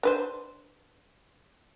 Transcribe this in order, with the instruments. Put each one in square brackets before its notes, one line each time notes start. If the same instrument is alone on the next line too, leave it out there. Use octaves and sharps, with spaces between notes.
[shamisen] D4 B4 C5